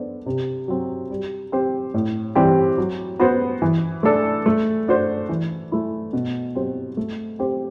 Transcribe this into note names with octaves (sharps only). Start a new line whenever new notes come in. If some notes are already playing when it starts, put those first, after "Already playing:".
Already playing: B3 D4 A4 C5
C3
F#3 C4
G3
C4 G4 C5
A2
E3 G3 C4 G4
F#3
B3 F#4 C5
E3
A3 D4 A4
A3
D4 F#4 C5
E3
A3 E4
B2
F#3 C4 G4 C5
A3
C4 G4 C5